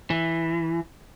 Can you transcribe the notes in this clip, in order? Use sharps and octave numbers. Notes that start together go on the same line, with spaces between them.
E3